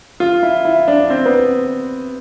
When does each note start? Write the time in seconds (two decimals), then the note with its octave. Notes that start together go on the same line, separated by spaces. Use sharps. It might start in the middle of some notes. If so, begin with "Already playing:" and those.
0.20 F4
0.43 E4
0.65 E4
0.88 D4
1.10 C4
1.25 B3